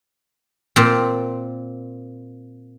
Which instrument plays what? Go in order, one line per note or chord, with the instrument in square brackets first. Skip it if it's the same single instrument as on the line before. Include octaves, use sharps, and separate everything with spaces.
[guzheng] A#2 C4